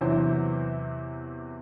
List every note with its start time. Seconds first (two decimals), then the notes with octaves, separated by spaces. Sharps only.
0.01 E2 C3 E3 F#3 C5